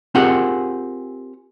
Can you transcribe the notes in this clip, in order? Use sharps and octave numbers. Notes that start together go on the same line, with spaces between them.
C4 F4 G4 G#4 A#4 F#5